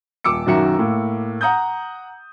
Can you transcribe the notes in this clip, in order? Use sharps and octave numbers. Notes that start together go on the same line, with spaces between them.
D#1 D6 E6 C#7
B1 F#2 D#3 F#4 E5 C#7
A2 A#3
F#5 A#5 D#6 G6